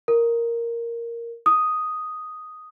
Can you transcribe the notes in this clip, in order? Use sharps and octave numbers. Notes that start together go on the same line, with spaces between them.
A#4
D#6